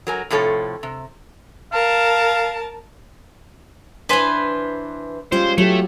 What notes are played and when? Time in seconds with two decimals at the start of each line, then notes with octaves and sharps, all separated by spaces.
0.07 F#3 A#4 G#5
0.30 A2 C3 F3 A4 C#5
0.83 C3
1.73 A#4 F5 A5
4.09 E3 D4 B4 C5 G#5
5.32 G3 G#3 C#4 F4 C5
5.58 F#3 A3 C#4 G4